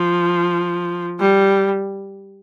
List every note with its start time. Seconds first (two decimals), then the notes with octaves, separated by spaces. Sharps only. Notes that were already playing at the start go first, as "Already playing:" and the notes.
Already playing: F3
1.20 G3